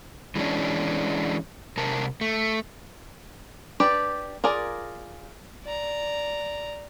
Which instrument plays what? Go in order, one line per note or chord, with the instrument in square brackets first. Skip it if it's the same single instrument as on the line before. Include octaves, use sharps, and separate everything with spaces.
[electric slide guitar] E3 G#3 B3 C#4 D4
C3 A#4 A5
A3
[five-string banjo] D4 G4 B4 D5
F4 G#4 A#4 D5
[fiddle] D5 A#5